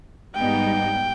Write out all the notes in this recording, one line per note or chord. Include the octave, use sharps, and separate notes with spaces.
G#2 G3 B3 D#4 G5